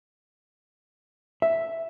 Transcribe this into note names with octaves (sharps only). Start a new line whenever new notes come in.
E5